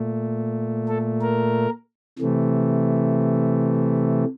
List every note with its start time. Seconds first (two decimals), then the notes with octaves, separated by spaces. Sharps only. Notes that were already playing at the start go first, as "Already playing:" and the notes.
Already playing: A#2 A3
0.88 A4
1.22 A#4
2.18 C3 E3 A3